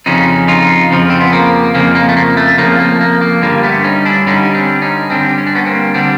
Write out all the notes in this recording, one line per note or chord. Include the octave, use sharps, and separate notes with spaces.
F2 C#3 F3 C#4 D#4
D#4 F4
F2 C#3 F3
C4
B3
A#3
F2 C#3 F3 A#3
A#3
A3
A#3
A3
F2 C#3 F3 A#3
A#3
A#3
A#3
G2 D3 G3 A#3
A3 B3
C#4 D#4
D4 E4
G2 D3 G3 C#4 D#4
C4 D4
C#4 D#4
G2 D3 G3 C4 D4
C#4
D4
B3 C#4
A#3 C4
D3 G3 C4 D4